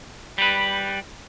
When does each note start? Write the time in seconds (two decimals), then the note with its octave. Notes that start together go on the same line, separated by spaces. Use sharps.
0.38 G3 B4